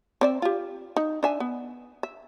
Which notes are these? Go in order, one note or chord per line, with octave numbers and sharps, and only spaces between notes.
C4 D5 E5
F4 G4
D#4
D4 E5 G#5
B3
E5